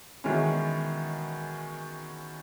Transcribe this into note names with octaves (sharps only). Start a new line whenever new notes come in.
B2 D#3 E3 G#3 C#4